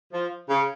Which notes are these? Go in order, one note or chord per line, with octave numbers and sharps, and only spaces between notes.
F3
C#3